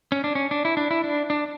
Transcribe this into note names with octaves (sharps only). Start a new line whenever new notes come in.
C#4
D4
C#4
D4
E4
D4
E4
D4
D4